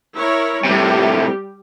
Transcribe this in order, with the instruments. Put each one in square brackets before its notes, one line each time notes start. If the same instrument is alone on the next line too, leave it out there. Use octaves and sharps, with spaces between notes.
[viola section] E4 A#4 C#5
[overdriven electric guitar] A2 C3 [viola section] G3 G4